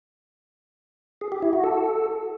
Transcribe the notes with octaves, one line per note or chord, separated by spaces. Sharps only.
G#4
G4
E4
F#4
A4